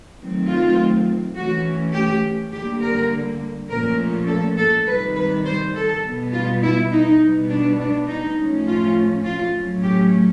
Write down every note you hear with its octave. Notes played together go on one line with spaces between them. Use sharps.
D#3 F#3 A3 C4
F4
E3 A3 C#4 F#4
G4
D3 G3 A#3 G4
A#4
A#2 F3 A3 C#4 A#4
A4
A4
C3 D#3 G3 B4
B4
C5
A4
B2 G3 B3
F4
E4
D#4
B2 G3 B3
D4
D4
D#4
A2 F3 A3 C#4
F4
F4
A2 F#3 A3 C#4
G4